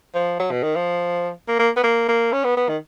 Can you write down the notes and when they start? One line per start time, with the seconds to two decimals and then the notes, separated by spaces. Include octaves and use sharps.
0.14 F3
0.39 F#3
0.51 B2
0.63 D#3
0.76 F3
1.47 A#3
1.59 A#3
1.77 B3
1.83 A#3
2.08 A#3
2.32 C#4
2.44 B3
2.56 B3
2.68 D#3